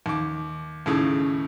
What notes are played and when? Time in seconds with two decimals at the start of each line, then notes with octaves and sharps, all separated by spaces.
0.06 D#2 D6
0.86 D#2 A2 C#3